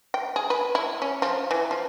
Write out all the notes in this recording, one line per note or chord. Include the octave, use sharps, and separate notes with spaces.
G5
G#4
B4
E4
C#4
F3
E3
F3